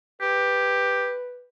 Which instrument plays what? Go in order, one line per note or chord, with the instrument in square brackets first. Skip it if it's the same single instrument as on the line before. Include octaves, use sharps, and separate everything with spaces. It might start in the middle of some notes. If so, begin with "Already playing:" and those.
[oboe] G4 [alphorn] B4